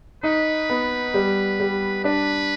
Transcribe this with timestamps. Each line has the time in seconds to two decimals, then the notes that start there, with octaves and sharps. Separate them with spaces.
0.23 D#4 B4
0.70 B3
1.14 G3
1.60 G3
2.04 D4 B4